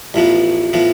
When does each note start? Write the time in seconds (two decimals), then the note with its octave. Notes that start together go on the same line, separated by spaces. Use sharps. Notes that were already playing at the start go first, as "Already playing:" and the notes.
0.14 A1 A2 F3 B3
0.73 A2 F3 B3